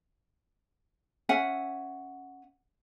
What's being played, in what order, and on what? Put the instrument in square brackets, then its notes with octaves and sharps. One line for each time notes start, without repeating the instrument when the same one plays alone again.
[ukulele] C#4 E5 F#5 G#5